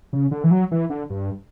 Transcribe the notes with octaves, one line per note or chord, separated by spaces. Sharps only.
C#3
D3
E3
F#3
E3
D3
G2